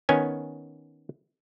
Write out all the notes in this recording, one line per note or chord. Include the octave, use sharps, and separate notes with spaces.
D#3 B3 C#4 G#5